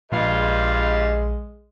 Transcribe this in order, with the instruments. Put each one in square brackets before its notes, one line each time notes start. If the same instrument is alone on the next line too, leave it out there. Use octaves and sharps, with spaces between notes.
[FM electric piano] A#1 [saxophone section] G2 F4 [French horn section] G#3 D#5